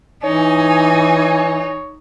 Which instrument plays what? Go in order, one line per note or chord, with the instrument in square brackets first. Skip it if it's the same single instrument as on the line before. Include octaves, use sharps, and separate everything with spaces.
[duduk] E3 [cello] D#4 [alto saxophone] C#5 [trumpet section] G#5